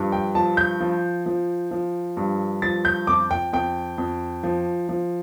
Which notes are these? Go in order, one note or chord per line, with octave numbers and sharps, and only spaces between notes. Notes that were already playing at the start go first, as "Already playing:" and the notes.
Already playing: G2 F3
G5
F3 A5
G6
F3
F3
F3
G2
F3 A6
G6
F2 D6
G5
F2 G5
F2
F3
F3